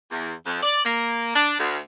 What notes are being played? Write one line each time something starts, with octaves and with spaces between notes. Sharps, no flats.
E2
F2
D5
A#3
D4
D2